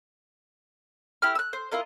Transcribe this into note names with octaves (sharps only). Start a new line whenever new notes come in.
E4 G4 F6
E6 F#6
C5
E4 F4 A#4 D#5